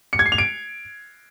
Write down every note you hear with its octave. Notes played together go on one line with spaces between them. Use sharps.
C#7
G#6
C7
F7
D7